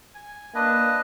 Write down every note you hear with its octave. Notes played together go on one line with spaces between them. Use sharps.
G#5
A#3 D4 B4 D#5